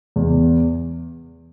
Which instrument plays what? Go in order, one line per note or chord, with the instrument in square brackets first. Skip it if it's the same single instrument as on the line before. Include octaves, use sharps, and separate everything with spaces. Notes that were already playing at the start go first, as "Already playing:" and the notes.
[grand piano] E2